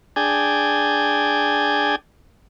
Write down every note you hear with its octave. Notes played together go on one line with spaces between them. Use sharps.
D4 G#4 G5 G#5